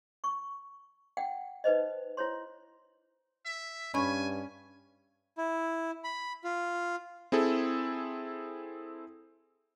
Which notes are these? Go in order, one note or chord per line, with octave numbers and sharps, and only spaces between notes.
C#6
F#5 G5
D#4 B4 C5 D#5
E4 C5 C#5 C6
E5
G2 C#4 G#5 B5 C#6
E4
B5
F4
C4 E4 G#4 A4